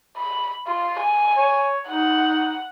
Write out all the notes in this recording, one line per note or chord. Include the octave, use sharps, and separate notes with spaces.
B5
F4
G#5
C#5
D#4 F#5